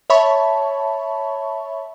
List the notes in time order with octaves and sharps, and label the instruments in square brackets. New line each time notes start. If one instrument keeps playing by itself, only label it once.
[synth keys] C#5 E5 A5 B5 C#6